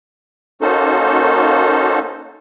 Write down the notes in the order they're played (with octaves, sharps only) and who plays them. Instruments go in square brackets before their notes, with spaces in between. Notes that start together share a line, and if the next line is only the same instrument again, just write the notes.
[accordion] A#3 C#4 D#4 F#4 A4 C5